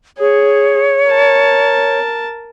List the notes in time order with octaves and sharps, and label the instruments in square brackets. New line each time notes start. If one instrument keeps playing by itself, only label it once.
[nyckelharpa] G#4 [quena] C#5
[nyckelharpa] A#4 A5